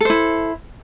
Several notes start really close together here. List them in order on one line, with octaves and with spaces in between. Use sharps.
A4 C5 E4